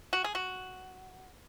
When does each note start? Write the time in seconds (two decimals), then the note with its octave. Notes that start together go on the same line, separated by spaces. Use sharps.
0.13 F#4
0.24 G#4
0.35 F#4